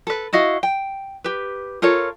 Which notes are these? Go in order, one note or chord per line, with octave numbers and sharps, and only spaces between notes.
A4 B4
E4 F#4 D#5 F5
G5
G4 B4
F4 A4 A#4 C#5